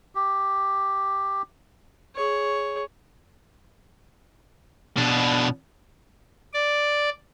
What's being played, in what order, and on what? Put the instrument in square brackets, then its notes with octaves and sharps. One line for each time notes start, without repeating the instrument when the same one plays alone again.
[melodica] G4
[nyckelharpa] G#4 C#5
[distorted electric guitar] B2 D4
[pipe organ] D5